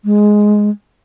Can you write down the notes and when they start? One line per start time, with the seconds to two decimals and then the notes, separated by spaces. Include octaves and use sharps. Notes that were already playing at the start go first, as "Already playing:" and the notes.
0.05 G#3